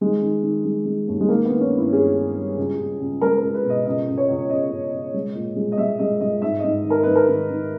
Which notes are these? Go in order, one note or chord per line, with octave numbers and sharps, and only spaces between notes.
D#3 G#3
D#3
D#3
G#3
G#3
D#2
G#3
D#3 A#3
B3
D#3
C#4
G2
E4
G2 G#4
G2
G3
C#2
C#2
C#2
G#3 A#4
A#4
C#2
B4
B2
D#5
C#2 D#5
C#2
C#5
C#2
C#2 D#5
C#2
C#2
G#3
A#2
G#3
D#5
G#3 E5
G#3 D#5
G#3 D#5
G#2 E5
G#2 D#5
D#3
A#4
G#2 B4
A#4
D#3
D#3